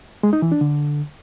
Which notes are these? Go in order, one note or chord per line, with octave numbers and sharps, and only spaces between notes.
G#3
D#4
E3
D4
D3